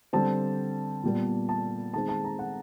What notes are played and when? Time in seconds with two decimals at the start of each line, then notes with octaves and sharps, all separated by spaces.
0.13 D3 G3 C4 A5
1.03 A#2 G3 B3
1.49 A5
1.94 D#3 G#3 C4 A5
2.09 A5
2.24 A#5
2.39 F#5